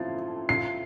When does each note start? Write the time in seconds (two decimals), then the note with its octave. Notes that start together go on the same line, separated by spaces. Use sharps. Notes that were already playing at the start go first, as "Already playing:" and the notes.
Already playing: A2 F3 F4 A6
0.18 A4
0.49 F4 C7